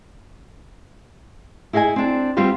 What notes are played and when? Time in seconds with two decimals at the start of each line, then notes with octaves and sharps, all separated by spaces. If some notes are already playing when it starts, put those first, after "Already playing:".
1.73 E4 G#4 D#5 F5 G#5
1.96 C4 D4
2.37 G3 B3 C4 F4 G4